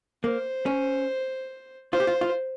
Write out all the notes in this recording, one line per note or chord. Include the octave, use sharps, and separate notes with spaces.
A#3 C5
C#4
F4 C5
G4
F4
F4